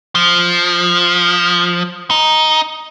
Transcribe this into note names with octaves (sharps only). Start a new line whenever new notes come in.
F3
D#4